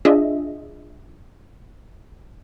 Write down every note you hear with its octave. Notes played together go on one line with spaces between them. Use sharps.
D4 F4 G#4 D#5 E5